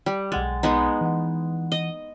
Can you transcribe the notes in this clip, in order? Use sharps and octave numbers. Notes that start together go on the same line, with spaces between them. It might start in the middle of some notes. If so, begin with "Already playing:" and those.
G3
B1 G#3 F#5 A6
G#3 B3 D#4
E3 F#5
D#5